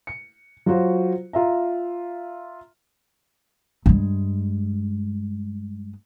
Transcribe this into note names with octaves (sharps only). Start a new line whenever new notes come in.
C#7
F#3 F4 F#4 C5
F4 E5 A#5
G2 G#3